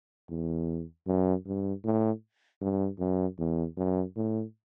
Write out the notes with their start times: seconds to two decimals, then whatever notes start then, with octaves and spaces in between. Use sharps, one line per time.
0.29 E2
1.07 F#2
1.46 G2
1.84 A2
2.61 G2
2.99 F#2
3.39 E2
3.77 F#2
4.16 A2